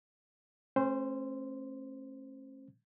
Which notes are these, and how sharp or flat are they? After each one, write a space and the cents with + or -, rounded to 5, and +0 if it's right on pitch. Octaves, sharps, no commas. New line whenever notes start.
A3 +0 C#4 -45 C5 -10